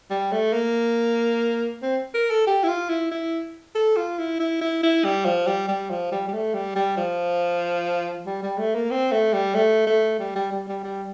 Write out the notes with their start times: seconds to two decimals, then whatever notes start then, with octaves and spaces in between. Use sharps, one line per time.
0.10 G3
0.32 A3
0.53 A#3
1.82 C4
2.14 A#4
2.30 A4
2.47 G4
2.64 E4
2.68 F4
2.89 E4
3.11 E4
3.75 A4
3.97 F4
4.19 E4
4.40 E4
4.61 E4
4.83 E4
5.04 G3
5.25 F3
5.47 G3
5.68 G3
5.90 F3
6.12 G3
6.28 G3
6.33 A3
6.54 G3
6.76 G3
6.97 F3
8.26 G3
8.43 G3
8.58 A3
8.75 A#3
8.91 C4
9.12 A3
9.33 G3
9.55 A3
9.87 A3
10.19 G3
10.36 G3
10.52 G3
10.68 G3
10.84 G3